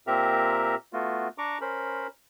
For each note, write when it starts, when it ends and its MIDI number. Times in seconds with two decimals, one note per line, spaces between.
0.07 0.75 46
0.07 0.75 60
0.07 0.75 67
0.07 0.75 70
0.07 0.75 76
0.07 0.75 82
0.93 1.28 57
0.93 1.28 59
0.93 1.28 65
0.93 1.28 66
1.38 1.58 62
1.38 1.58 82
1.38 1.58 85
1.38 1.58 86
1.61 2.07 61
1.61 2.07 70
1.61 2.07 72
1.61 2.07 83